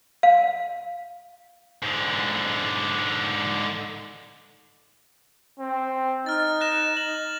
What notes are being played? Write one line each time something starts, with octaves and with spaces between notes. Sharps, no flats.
F5
G#2 D3
C4
D#4 F6 A6
F#6 A#6 E7
F#7